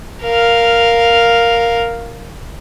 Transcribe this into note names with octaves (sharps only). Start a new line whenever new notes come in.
A#4 F5